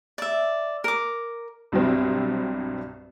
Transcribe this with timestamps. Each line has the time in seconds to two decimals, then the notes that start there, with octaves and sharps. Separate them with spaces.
0.18 D5 E5
0.84 A#4 D6
1.72 C2 G2 B2 F#3 G3 C4